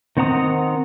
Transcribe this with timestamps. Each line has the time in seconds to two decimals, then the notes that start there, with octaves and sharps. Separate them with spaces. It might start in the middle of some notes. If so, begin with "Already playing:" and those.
0.17 D#3 C4 F#5 A#5 D#6